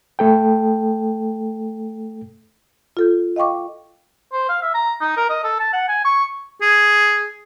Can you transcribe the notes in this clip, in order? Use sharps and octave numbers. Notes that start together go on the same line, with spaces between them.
A3 A4 G5
F4 A4 G6
D#5 F5 G5 C#6 D6
C5
F5
E5
A#5
D#4
A#4
D#5
A4
A5
F#5
G#5
C#6
G#4